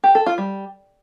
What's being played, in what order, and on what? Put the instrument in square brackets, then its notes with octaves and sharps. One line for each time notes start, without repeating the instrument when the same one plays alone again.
[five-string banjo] G4
A4
F4
G3